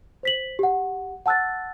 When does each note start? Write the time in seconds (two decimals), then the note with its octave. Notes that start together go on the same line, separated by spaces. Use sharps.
0.23 C5 B6 F#7
0.59 G4 F#5
1.26 F#5 A5 E6 F#6 A6